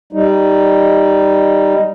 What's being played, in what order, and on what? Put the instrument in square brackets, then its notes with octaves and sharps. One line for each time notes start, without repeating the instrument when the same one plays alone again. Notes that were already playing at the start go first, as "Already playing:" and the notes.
[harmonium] G3 D#4